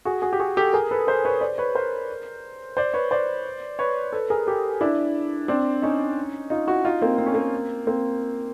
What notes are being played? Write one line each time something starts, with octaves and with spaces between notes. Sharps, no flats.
F#4 G#4
F#4 G#4
G4
F#4 G#4
G4 A4
G#4 A#4
A4 B4
A#4 C5
B4 C#5
C5 D5
B4 C#5
A#4 C5
C5 D5
B4 C#5
C5 D5
B4 C#5
A4 B4
G#4 A#4
G4 A4
D4 E4
C4 D4
C#4 D#4
D#4 F4
E4 F#4
D#4 F4
A#3 C4
C4
C#4
A#3 C4
A#3 C4